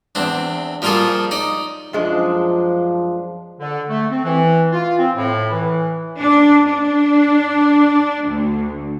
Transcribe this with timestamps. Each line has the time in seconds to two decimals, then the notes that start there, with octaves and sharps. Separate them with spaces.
0.15 E2 C4 D4
0.82 F3 G3 A#3 F4 G#4 A4
1.31 D#4 D5
1.93 F#2 F3 G#3 D4
3.60 D3
3.89 A3
4.10 C4
4.24 E3
4.72 F4
4.98 C4
5.16 A2
5.51 E3
6.20 D4
6.67 D4
8.27 D2